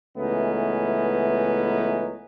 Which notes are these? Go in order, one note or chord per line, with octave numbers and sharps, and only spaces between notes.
C#2 E3 A3 B3 C#4 D#4